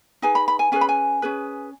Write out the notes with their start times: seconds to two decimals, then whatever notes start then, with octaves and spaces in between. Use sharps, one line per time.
0.22 D#4 G#4 B4 G#5
0.35 B5
0.48 B5
0.59 G#5
0.72 C#4 G#4 B4 G#5
0.81 B5
0.89 G#5
1.22 C#4 G#4 B4